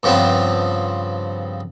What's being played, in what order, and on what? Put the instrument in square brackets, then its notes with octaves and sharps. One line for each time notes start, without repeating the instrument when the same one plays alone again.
[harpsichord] G2 C#3 F3 B3 C4